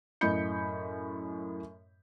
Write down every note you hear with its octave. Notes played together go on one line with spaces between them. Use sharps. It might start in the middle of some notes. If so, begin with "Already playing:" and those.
F#2 A2 D#5 B5 G6 C#7